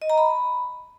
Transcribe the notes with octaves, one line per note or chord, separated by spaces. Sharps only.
D#5
A#5
B5